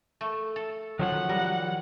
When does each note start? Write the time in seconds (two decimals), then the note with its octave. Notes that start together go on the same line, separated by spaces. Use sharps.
0.21 A3
0.56 A4
0.99 D#3 F3 F#3 C#4 F#5
1.29 G3 A#4